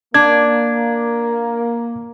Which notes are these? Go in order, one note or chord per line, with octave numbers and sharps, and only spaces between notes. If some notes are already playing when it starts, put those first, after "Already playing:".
A#3 D4 G#6